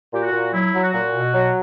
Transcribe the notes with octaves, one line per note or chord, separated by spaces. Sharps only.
A#2 G4
F#4
A#2
F#3 E4
F#3
F#4
A#2
B2
F#3